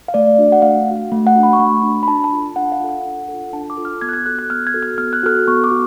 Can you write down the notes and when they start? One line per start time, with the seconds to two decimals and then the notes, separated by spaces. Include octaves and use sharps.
0.08 F5
0.14 A3 D5
0.39 D4 F#4
0.52 F#5
0.62 A3 F5
0.87 D4 F#4
1.12 A3
1.27 F#5
1.35 D4 F#4
1.43 B5
1.53 C#6
1.59 A3 B5
1.83 D4 F#4
2.03 B5
2.08 D4 A5
2.24 A5
2.32 F4 A4
2.56 D4 F#5
2.72 F5
2.80 F4 A4
2.89 F#5
3.05 D4
3.29 F4 A4
3.53 D4 A5
3.70 D6
3.77 F4 A4
3.85 F6
4.01 B3 G#6
4.09 F#6
4.13 G#6
4.26 F#4 A4 F#6
4.39 F#6
4.50 B3 F6
4.67 G#6
4.74 F#4 A4
4.83 F6
4.98 B3 F6
5.13 F#6
5.23 F#4 A4 F6
5.48 B3 C#6
5.64 D6
5.71 F#4